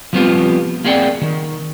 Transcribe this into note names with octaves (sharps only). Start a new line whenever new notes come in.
F3 G3 B3 C4 F4 G4
A#3 C4 G#4 D5 F#5 G5
D#3